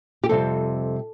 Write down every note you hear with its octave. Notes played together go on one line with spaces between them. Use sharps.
G4
F2 C3 G3 A4